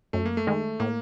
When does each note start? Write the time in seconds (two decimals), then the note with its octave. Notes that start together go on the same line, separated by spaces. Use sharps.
0.13 F#2 A3
0.26 A#3
0.37 A3
0.47 D#3 G#3
0.80 A2 A#3